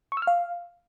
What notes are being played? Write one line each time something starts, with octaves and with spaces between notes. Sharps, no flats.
C#6
E6
F6
F5